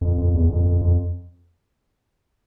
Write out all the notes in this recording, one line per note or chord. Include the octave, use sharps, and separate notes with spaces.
F2
F2
E2
F2
F2
F2